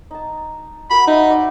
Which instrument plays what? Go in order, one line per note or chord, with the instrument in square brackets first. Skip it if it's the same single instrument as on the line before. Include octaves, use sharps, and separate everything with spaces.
[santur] D#4 A5
[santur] F#4 A#4 D6 [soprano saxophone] B5
[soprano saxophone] D#4 [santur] E5 F#5 C6
[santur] B4 D5